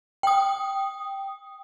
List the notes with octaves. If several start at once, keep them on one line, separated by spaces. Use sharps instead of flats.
G5 D#6